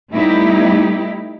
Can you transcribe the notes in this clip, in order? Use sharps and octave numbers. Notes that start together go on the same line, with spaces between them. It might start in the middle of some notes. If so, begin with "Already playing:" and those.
G3 A3 B3 D#4 E4 G4